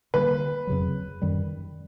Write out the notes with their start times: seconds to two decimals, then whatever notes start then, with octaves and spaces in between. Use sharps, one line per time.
0.14 D3 G3 A#3 B4
0.67 F2 C#3 F#3
1.22 F#2 D#3 G3